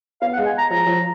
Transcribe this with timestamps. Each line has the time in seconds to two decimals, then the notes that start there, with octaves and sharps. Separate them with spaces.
0.22 B3 F5
0.33 F#5
0.38 G#3
0.46 G#5
0.54 G#3 A#5
0.71 F3 A#5
0.87 F3